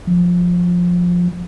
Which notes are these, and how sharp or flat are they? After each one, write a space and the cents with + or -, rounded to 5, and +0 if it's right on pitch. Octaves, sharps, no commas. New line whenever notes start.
F3 +15